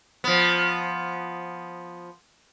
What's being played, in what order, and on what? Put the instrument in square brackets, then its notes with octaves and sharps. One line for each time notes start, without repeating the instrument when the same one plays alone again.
[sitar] F3 B3